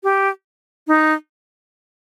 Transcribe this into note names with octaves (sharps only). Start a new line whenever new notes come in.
G4
D#4